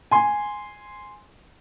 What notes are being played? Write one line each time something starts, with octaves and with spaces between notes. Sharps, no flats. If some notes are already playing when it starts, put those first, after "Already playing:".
G#5 C6